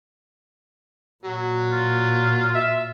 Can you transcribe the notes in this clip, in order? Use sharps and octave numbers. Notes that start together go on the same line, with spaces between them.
A#2 F#3
F4
E5